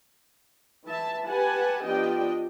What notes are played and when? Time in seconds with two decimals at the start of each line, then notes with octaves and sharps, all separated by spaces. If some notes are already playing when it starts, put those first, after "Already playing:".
0.87 E3 E5 A5
1.28 G4 B4 F#5 G#5 A5
1.85 F3 B3 D4 G4 D#5 G5